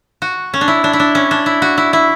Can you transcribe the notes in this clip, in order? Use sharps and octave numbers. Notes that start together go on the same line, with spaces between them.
F#4
C#4
D4
E4
D4
E4
D4
C#4
D4
E4
F#4
E4
E4